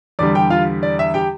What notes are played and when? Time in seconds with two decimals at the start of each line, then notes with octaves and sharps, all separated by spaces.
0.19 E2 D3 G3 D5 D6
0.35 G4 G5
0.50 F4 F5
0.83 D5
0.99 E5
1.14 G4 G5